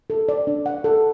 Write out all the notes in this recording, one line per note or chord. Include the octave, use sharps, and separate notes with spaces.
A4
D5
D4
F#5
A4